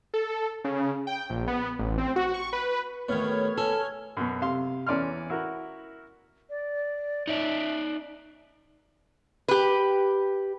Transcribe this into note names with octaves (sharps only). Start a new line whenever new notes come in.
A4
C#3
G5
A#1
B3
A1
C4
F#4
C#6
B4
D#2 A2 B3 C#5 F6 G#6
C#4 A4
F#2 B2
C3 F5 C6
E2 C#4 D5 C6 F6
E4 F#4 A#4
D5
D#4 C#5 D5 E5
G4 B4